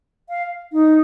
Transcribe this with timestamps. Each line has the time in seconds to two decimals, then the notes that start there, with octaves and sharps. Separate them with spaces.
0.29 F5
0.72 D#4